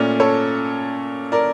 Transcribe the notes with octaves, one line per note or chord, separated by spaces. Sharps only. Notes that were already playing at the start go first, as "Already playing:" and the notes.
Already playing: A#2 A3 C#4 A#4 D5
A4 C#5
A#4 D5